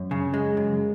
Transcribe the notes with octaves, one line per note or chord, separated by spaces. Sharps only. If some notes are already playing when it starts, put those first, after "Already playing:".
Already playing: F#2
C#3
G#3
F#2